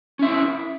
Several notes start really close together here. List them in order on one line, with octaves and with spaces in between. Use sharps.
C#4 E5 E4 A#4